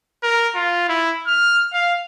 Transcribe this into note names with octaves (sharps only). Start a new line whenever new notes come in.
A#4
F4
E4
F6
F5